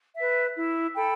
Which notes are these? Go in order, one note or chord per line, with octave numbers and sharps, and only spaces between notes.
B4 E5
E4
A4 G5 B5